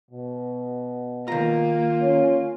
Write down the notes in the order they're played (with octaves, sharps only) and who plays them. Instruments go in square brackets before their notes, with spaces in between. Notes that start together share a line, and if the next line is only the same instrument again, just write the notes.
[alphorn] B2
[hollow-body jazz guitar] D#3 A#5 [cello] A#3 [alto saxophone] F4
[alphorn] C#4